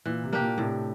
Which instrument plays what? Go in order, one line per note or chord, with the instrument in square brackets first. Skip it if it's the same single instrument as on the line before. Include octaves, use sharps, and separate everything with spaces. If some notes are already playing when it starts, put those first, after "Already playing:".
[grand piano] A#2 [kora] E3
[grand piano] C3
[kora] A#3 D4 G4
[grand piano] A#2
[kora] A2 [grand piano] C3